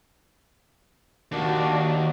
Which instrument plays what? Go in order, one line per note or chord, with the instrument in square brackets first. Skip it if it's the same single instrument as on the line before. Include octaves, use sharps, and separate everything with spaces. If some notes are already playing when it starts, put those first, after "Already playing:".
[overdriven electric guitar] D#2 [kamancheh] D4 F#4